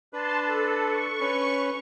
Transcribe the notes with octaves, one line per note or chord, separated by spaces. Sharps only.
D4 B4 A5 C6
A4
C#6
C#4 B4